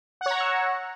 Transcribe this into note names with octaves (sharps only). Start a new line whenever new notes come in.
C#5 F#5 A#5 C#6 E6